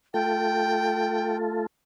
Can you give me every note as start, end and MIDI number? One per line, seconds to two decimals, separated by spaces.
0.14 1.66 57
0.14 1.66 65
0.14 1.66 69
0.14 1.36 79